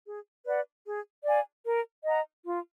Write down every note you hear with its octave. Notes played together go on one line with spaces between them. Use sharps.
G#4
B4 D5 F#5
G#4
D5 F5 G#5
A#4
D#5 F#5 A#5
F4